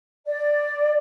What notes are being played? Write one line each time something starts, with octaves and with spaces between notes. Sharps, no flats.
D5